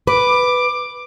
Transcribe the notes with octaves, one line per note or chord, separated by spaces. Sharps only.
B4 D6